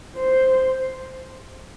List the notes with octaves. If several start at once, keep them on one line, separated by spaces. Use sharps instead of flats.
C5